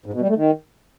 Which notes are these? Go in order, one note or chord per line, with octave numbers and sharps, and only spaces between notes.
G#2
B2
G3
A3
D#3